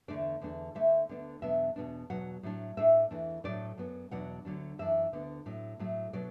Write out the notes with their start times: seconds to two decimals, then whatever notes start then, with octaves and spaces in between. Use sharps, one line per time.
0.08 E2 D3 A3 D4 D5
0.41 E2 D3 A3 D4
0.75 D2 D3 A3 E5
1.09 D2 D3 B3 D4
1.42 E2 B2 F#3 B3 D4 E5
1.76 E2 B2 B3 D4
2.10 E2 B2 F#3 F#5
2.43 A2 F#3 D4
2.77 A2 A3 D4 E5
3.11 E2 E3 A3 D4
3.44 A2 F#3 A3 D4 D5
3.77 F#2 F#3 B3 D4
4.11 E2 B2 F#3 D4 F#5
4.45 D2 D3 F#3 D4
4.79 F#2 E3 D4 E5
5.13 D2 D3 B3 D4
5.46 A2 F#3 D4
5.79 A2 F#3 A3
6.13 B2 F#3 D4 D5